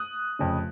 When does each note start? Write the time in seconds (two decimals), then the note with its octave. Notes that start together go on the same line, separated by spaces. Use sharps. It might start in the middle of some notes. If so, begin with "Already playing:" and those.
Already playing: D#6 F#6
0.39 F1 F2 C#3 F3